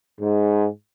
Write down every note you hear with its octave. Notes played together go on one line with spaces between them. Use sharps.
G#2